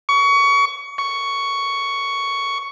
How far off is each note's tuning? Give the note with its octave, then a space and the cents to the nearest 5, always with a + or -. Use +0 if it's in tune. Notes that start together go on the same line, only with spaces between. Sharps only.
C#6 +25
C#6 +10